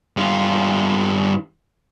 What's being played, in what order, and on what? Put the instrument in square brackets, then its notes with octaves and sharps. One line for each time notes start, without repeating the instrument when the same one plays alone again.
[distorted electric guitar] G2 F4